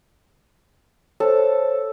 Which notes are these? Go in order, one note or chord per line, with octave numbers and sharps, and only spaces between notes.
A4 C5 C#5